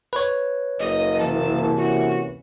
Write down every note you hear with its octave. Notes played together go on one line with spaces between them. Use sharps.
B4 C#5
F#1 D#5
C3 E3 A#3 A5
C#4 F#4